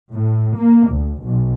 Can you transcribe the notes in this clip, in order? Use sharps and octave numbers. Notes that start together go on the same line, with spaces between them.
A2
A#3
D2
B1